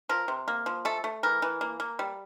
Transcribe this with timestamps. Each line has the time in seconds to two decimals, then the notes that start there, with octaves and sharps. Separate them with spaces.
0.09 F3 A#4
0.28 C3
0.48 A#3
0.66 F3
0.85 A3 A4
1.04 A3
1.23 E3 A#4
1.42 E3
1.61 A#3
1.80 A#3
1.99 G3